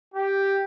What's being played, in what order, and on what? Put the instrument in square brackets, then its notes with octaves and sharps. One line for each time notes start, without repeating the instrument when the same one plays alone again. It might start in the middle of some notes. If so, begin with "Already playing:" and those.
[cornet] G4